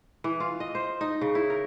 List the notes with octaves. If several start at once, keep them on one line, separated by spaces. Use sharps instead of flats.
E3
F4
D#5
C5
D#4
C#3
E4
A#4